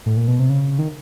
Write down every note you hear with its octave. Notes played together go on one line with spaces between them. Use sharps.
A2
A#2
B2
C3
C#3
D#3